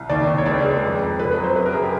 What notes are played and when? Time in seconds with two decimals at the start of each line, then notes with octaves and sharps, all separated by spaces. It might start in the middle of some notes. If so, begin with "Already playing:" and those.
Already playing: C2
0.10 D#2 D5
0.27 D#2
0.38 C#5
0.46 C#2 D5
0.64 G#3
0.83 F2
1.01 F2
1.19 F2 B4
1.31 B4
1.37 F#3
1.44 C5
1.55 F#2 B4
1.66 A#4
1.74 F#2 G#4
1.83 G4